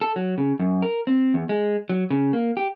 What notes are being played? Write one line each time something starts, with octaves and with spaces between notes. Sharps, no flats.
A4
F#3
C#3
F#2
A#4
C4
E2
G#3
F#3
C#3
A#3
G4